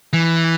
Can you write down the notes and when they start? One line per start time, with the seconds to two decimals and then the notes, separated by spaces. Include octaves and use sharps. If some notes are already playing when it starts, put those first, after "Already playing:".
0.13 E3